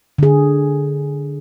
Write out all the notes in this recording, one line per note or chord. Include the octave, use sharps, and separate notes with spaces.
D3 G#4